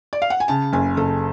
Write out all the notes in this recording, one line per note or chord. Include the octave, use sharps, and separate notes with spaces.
D5
F5
F#5
G#5
C#3 A5
F#1 G#5
F#1 A4